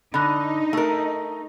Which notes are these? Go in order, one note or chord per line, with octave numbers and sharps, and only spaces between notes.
D3 D#4 B5 F#6
A3 A#4